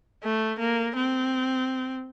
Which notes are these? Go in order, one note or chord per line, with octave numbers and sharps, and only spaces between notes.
A3
A#3
C4